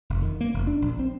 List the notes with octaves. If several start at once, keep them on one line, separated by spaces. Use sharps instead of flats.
F1
D#3
A#3
F1
D4
A#1
C4